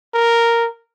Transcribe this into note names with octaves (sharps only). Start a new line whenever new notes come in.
A#4